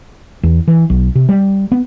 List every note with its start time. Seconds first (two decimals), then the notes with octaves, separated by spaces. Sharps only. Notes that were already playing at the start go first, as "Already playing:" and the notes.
0.43 E2
0.68 E3
0.90 B1
1.15 C3
1.29 G3
1.72 B3